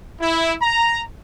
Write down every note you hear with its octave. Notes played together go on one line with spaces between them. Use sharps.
E4
A#5